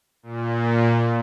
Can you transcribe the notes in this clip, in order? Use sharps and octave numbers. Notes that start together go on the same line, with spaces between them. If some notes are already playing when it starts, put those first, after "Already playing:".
A#2